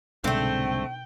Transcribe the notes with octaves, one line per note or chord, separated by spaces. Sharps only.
C2 G#2 B2 D3 A3 C4 G5